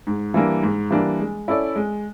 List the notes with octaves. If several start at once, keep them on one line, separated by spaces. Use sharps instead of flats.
G#2
E3 G3 A#3 D4
G#2
E3 G3 A#3 D4
G#3
C#4 E4 A4 D5
G#3